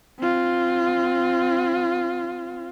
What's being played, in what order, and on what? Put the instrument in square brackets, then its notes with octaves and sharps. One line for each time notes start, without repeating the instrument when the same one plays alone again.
[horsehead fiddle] C4 F4